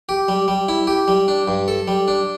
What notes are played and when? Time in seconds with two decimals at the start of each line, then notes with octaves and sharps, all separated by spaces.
0.09 G4
0.28 G3
0.48 G3
0.68 E4
0.87 G4
1.08 G3
1.28 D4
1.48 G2
1.68 A4
1.88 G3
2.08 D4